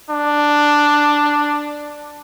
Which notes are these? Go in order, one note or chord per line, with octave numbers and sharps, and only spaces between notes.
D4